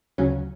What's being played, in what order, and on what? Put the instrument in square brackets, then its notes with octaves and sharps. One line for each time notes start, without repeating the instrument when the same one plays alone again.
[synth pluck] D2 C#3 F#3 C#4